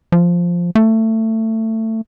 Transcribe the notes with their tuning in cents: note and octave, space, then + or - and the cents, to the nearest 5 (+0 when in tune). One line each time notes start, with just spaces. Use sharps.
F3 +0
A3 +20